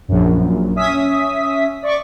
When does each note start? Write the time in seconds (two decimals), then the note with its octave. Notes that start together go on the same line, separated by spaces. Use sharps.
0.08 A#1 F#2
0.76 C#4 E5 D#6 B6
1.83 D5 C#6 D6